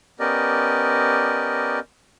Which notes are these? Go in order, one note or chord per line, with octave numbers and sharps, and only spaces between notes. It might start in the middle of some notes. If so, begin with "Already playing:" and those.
B3 C#4 G4 A#4 D5 D#5